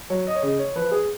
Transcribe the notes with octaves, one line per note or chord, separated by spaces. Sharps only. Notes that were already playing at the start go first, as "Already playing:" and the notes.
F#3 C#5
D#5
C#5
C#3 D#5
C#5
F3 B4
G#4